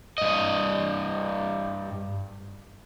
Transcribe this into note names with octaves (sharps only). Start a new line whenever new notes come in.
G2 D#5